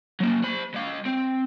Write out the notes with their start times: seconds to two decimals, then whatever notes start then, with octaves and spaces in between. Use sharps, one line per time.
0.20 F#3 A#3
0.44 C5 B5
0.74 G#3 F5
1.05 C4